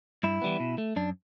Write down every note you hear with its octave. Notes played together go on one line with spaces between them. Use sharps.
G2 E4
E3 G3 B3
B2
A3
F#2 D4